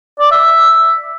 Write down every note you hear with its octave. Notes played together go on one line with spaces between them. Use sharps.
D5
E5